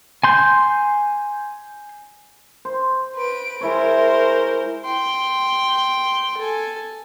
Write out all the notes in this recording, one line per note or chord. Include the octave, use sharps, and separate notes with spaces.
G#5 C6 G6
C5
B4 D7
G#3 E4 A#4 C5 C#5
G5 C6
A4 G#5